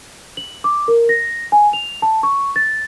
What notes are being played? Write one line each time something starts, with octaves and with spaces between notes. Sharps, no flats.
F#7
D6
A#4
A#6
G#5
F7
A5
C#6
A6